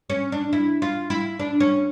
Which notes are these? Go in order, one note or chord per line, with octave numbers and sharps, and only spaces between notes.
C#4
D4
E4
F4
E4
D4
C#4